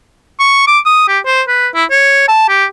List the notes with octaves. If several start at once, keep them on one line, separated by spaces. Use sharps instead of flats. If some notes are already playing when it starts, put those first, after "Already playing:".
C#6
D6
D#6
G4
C5
B4
E4
C#5
A5
G4